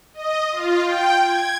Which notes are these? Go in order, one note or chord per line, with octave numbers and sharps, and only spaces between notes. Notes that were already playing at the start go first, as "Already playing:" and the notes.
D#5
F4
G5
G#6